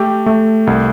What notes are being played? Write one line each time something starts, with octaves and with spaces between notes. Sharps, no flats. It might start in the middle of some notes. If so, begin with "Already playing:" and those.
Already playing: A3 G4
A3
C2